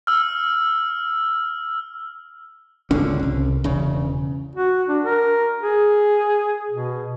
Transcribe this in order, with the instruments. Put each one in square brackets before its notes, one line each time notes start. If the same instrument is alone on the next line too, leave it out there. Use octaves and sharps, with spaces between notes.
[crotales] E6 F6
[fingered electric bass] G#1 C#2 D3 C#4
C2
E1 C#3
[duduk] F#4
D4
A#4
G#4
B2